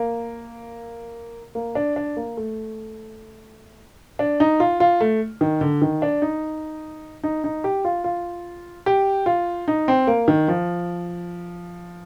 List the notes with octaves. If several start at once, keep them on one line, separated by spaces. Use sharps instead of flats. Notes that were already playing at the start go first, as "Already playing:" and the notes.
Already playing: A#3
A#3
D4
D4
A#3
A3
D4
D#4
F4
F4
A3
D#3
D3
D#3
D4
D#4
D#4
D#4
G4
F4
F4
G4
F4
D#4
C4
A#3
D#3
F3